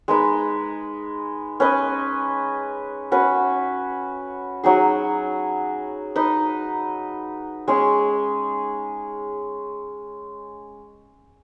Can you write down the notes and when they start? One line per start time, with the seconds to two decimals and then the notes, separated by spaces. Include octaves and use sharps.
0.08 G#3 D#4 B4
1.60 C#4 B4 D#5
3.12 C#4 F#4 B4
4.64 F#3 D#4 G#4
6.16 D#4 B4 D#5
7.68 G#3 C#4 G#4